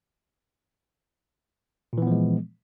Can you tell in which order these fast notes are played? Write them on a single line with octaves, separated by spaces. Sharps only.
A#2 E3 B3 F3 G#3